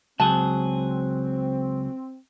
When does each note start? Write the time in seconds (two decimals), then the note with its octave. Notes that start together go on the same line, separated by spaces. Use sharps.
0.20 C#2 F#3 C4 G#4 A5